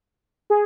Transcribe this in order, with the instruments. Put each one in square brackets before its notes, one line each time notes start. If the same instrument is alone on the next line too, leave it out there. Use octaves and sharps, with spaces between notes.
[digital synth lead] G#4